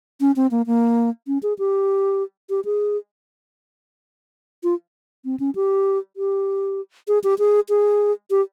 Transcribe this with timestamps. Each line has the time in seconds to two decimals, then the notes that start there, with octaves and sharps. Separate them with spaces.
0.21 C#4
0.36 C4
0.51 A#3
0.67 A#3
1.27 C#4
1.43 G#4
1.59 G4
2.50 G4
2.65 G#4
4.63 F4
5.25 C4
5.40 C#4
5.55 G4
6.17 G4
7.08 G#4
7.24 G4
7.39 G#4
7.69 G#4
8.31 G4